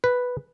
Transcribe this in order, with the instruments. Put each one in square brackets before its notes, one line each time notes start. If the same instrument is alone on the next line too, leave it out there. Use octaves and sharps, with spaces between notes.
[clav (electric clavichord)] B4